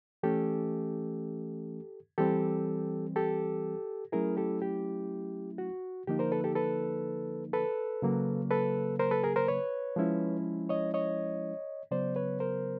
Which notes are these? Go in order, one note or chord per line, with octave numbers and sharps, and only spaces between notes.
E3 A3 C#4 G4 A4
E3 G3 C4 G4 A4
G4 A4
F#3 A3 C#4 E4 G#4 A#4
G4 A4
G4
F#4
D3 F3 A#3 D#4 G4
A#4 C5
A4 B4
G4 A4
A4 B4
A4 B4
C#3 F#3 A#3
A4 B4
A#4 C5
A4 B4
G#4 A#4
A#4 C5
B4 C#5
F3 G#3 C#4 E4
C#5 D#5
C#5 D#5
C#3 F#3 B3 C5 D5
B4 C#5
A#4 C5